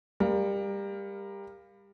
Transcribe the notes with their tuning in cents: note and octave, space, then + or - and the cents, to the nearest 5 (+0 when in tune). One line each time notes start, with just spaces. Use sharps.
G3 +25 A#4 +5 F5 +0